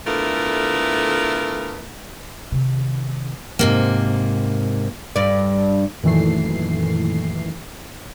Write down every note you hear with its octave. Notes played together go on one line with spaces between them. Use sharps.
D3 A3 B3 E4 F4 A#4
C3 D#3
G#2 C3 A#3
G2 D5
F#2 A#2 D#3 E3 A3 C7